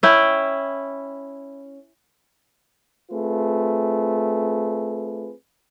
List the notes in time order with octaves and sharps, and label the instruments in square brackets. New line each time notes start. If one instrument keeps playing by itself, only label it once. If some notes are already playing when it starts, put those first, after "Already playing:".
[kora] C#4 E4 G5
[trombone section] A3 C4 F4 G#4 B4